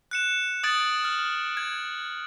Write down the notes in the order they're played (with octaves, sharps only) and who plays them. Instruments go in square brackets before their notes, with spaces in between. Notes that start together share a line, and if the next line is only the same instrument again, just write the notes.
[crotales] F#6 C#7 E7
D#6 G#6 A6 D7 F#7
F6
G#6